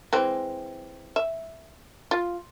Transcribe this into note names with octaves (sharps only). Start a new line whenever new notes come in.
E3 G#3 C4
E5
F4